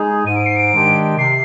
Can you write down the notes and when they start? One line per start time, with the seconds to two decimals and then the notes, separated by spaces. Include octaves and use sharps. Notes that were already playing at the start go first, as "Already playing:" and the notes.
Already playing: G#3 D#4 G#4
0.26 G#2 D#7
0.36 D7
0.46 C7
0.56 D7
0.72 D#3 G#3 D4 G4
1.18 C3 C7